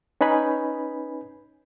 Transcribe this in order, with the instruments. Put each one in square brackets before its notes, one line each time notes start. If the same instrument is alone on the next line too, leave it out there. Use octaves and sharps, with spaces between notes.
[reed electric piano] C#4 D#4 B4 G#5 B5